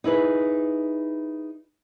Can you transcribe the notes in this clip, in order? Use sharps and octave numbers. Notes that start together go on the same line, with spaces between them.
D#4 E4 G#4 B4